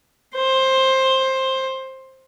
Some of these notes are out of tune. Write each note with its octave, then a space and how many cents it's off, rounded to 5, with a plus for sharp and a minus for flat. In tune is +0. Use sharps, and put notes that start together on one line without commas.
C5 +15